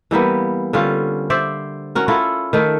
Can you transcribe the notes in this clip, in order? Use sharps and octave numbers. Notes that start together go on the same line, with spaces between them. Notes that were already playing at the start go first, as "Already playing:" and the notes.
E3 G3 A#3 B3
D3 G3 C#4 F4
C5 D5 E5
C#4 F#4 A#4
C#4 E4 F4 A4
D#3 A3